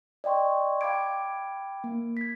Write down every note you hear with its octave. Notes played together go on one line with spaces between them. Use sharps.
D5 D#5 G5 C6 C#6
F5 G5 B5 D6 G#6 D7
A#3
G#6 B6